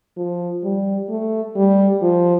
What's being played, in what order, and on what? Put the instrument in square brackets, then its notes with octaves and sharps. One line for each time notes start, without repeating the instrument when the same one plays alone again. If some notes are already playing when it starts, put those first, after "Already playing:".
[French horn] F3
G3
A3
G3
F3